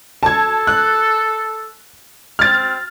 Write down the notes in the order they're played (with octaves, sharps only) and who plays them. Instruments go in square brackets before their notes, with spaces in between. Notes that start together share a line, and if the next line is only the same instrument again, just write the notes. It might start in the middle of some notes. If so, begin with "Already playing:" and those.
[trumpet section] A4 [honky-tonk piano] A5 G#6
[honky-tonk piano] F#6
[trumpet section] C4 [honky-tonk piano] F6 A6